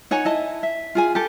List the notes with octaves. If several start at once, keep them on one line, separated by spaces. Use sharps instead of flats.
D#4 C#5 F#5 G#5
E4 D#5 A5
E5
F4 G#4 G#5
G4 A4